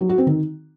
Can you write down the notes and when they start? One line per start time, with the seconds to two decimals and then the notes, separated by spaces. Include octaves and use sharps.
0.01 F#3
0.09 F#4
0.18 C4
0.27 D#3